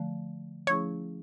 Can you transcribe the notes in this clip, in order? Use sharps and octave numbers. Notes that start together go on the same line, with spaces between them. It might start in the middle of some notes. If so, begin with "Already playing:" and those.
Already playing: D3 F3 A3
F3 A3 C#4 E4 G#4 C#5